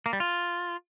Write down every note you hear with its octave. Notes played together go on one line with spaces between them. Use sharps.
A#3
G3
F4